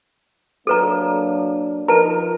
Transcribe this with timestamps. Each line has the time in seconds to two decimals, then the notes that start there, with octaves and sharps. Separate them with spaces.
0.67 F#3 A#3 D4 A4 B4 A#5
1.88 F3 D#4 A#4 B4 A5